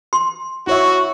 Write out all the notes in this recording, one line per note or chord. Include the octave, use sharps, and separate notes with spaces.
C6
E4 F#4 C#5 E5 C#6